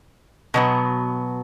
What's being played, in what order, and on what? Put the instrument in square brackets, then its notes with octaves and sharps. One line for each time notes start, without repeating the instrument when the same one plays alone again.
[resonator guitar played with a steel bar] B2 F#3 B3